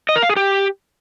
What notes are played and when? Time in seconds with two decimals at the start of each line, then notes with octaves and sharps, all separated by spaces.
0.09 D#5
0.16 A#4
0.23 F5
0.30 G#4
0.36 G4